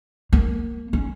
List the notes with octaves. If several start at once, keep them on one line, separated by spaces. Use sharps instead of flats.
A#3
C#4